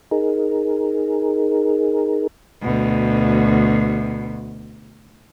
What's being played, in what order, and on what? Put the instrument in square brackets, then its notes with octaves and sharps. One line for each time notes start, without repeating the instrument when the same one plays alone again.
[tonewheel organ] D#4 G#4 A#4
[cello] D2 B2